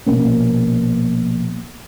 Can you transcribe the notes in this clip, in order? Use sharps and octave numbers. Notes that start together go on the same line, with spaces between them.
A#1 B2 A#3 C#4